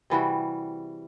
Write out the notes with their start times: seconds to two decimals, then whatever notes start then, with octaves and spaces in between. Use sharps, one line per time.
0.10 C3 E3 G3 F#4